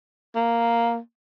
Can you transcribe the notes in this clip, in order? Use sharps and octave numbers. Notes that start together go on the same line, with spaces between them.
A#3